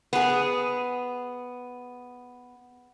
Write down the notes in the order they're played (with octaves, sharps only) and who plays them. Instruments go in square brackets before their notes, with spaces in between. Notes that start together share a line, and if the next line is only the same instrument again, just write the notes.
[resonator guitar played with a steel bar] B3 G#4